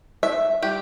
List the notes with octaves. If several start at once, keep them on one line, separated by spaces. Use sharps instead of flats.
E5
G3 D4 G4